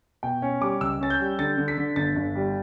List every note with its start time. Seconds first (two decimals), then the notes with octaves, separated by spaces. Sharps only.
0.23 B2 G5
0.42 C#4
0.61 G3 D6
0.81 C#2 E6
1.01 C#4 A6
1.10 G6
1.20 G3
1.39 D3 A6
1.58 D3
1.68 B6
1.78 D3
1.96 G1 A6
2.16 G1
2.35 G3